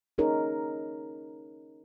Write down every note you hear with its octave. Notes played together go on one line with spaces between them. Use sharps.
C#4 D#4 G#4 A#4 C#5